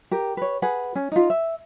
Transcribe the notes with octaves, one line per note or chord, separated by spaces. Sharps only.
G4 A#4
B4 C#5
G#4 B4 F#5
C#4
D#4 F4
E5